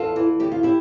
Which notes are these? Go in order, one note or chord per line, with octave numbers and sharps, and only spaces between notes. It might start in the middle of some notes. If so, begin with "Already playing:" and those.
Already playing: E2 F4 A4
E3
D2 G4
F4
E4 G4